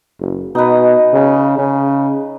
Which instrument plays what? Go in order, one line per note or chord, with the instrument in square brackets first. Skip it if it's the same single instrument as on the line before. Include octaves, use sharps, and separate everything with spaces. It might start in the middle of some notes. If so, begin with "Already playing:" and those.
[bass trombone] F#1
[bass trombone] B2 [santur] D#4 B4
[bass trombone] C#3
C#3